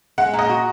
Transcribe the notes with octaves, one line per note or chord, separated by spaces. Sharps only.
G#3 F#5
A#2
D#5
F#4